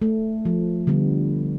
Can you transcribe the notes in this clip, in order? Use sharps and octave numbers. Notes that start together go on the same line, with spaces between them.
A3
F3
D3 G3 B3